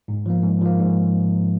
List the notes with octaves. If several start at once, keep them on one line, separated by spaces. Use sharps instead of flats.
G#2
F3 A#3
G#2
F3 A#3
G#2